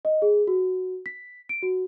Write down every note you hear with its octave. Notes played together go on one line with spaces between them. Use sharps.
D#5
G#4
F#4
B6
D7
F#4